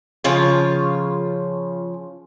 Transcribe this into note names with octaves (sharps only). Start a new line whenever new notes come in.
C#3 F3 F4 C#5